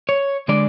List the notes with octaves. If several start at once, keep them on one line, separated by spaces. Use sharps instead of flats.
C#5
D3 G#3 D4 D5